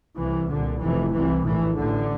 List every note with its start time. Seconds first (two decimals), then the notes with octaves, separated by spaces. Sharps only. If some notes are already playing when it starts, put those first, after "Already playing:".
0.17 C2 C3 E3
0.49 C2 A#2 D3
0.81 F1 F2 C3 E3
1.13 C2 C3 E3
1.44 A#1 A2 E3
1.76 A1 A2 D3